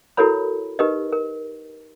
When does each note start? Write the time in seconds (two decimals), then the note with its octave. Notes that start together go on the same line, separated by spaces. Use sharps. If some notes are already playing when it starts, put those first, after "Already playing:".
0.17 E4 F#4 A4 A#4 C#5 B5
0.79 D#4 G4 A#4 B4 D#5
1.12 A#4